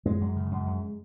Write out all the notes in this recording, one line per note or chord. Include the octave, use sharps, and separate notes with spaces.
F#2 G#3
F#2
C#3
F#2
F#2